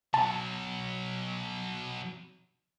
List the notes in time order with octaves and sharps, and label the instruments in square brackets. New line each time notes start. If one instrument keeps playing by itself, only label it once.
[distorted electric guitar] B2 F#3 [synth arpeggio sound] A5